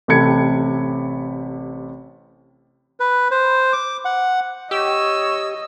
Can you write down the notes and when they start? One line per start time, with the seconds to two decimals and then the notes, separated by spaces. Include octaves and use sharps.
0.08 A1 C3 A4 B5 G#6 C#7
3.00 B4
3.31 C5
3.73 D6
4.05 F#5
4.71 G4 C#5 D#5 E6